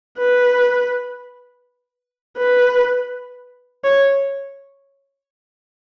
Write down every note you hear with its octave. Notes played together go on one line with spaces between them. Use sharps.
B4
B4
C#5